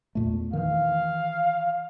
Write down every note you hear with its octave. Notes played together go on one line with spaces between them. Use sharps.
E2 A#2 A3
D#3 E3 F5